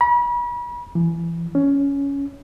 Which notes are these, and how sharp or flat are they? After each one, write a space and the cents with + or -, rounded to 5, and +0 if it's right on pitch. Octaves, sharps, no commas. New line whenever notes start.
B5 -40
E3 +25
C#4 +10